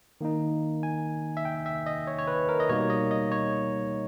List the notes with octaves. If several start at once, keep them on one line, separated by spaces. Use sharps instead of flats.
D#3 A#3 D#4
G#5
E5
G5
E5
D#5
C#5
C#5
B4
A#4
D#5
B2 G3 A#3 D#4 C#5
D#5
D#5
C#5